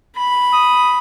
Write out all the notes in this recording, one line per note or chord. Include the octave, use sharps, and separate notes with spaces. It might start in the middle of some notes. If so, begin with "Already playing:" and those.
B5
D#6